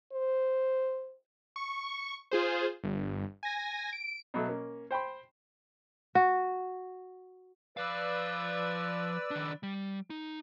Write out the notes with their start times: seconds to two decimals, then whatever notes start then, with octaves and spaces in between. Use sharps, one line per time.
0.12 C5
1.56 C#6
2.31 F4 G#4 C5
2.84 G1
3.43 G#5 A#6
3.93 D7
4.34 B2 F#3 A3
4.47 A#3 C#4
4.91 C5 G5 B5 C6
6.15 F#4
7.77 F3 B4 D5 F5 E6
9.31 D#3 D4
9.63 G3
10.10 D#4